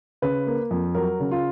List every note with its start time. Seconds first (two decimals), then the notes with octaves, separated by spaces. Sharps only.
0.22 C#3 B4
0.47 A#3
0.71 F2
0.95 F#3 A#4
1.20 C#3
1.31 F4